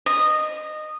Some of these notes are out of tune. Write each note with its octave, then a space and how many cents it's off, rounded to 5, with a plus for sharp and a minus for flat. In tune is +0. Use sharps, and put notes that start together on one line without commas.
D#5 -15